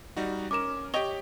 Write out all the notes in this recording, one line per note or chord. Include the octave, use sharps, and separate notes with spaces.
G3 D#4 F#4
C#4 A#4 D6 E7
G4 C#5 D#5 G5 C#6 G7